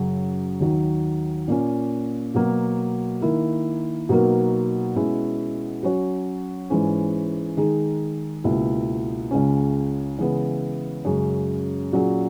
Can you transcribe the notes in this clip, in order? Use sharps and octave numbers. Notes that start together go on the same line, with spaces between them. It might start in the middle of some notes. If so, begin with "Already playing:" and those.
Already playing: F#2 C#3 F#3
D#2 D#3 F#3
A#2 A#3 C#4
B2 F#3 A#3
D#3 A#3 E4 A#4
B2 F#3 A#3 D#4 A#4
B2 G#3 C#4 E4 G#4
F#3 C#4 F#4 C#5
G#2 E3 G#3 C#4
D#3 G#3 D#4 G#4
C#2 B2 A#3 E4
C#2 C#3 G#3 C#4
C#3 E3 G#3 B3 E4
F#2 C#3 G#3 C#4
A#2 F#3 C#4 G#4